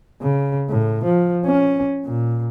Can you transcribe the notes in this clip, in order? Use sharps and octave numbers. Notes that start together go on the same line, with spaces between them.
C#3
A2
F3
C#4
A#2